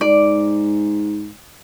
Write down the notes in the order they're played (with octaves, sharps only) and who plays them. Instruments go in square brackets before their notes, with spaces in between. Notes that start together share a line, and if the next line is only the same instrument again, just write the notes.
[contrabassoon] G#2 [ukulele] D5